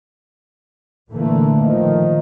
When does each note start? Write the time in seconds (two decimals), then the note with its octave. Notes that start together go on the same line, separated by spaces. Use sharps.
1.11 A#2 D3 E3 A3 A#3
1.64 D#3 F3